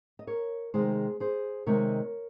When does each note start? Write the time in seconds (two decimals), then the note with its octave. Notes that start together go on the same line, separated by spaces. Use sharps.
0.19 D#5
0.27 A#4 C#5
0.74 C3 D#3 G#3 G#4 C5
1.20 G#4 C5
1.66 C3 D#3 G#3 A#4 C#5